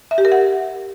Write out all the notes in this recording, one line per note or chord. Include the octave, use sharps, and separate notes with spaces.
E5
G4
A#4
F#5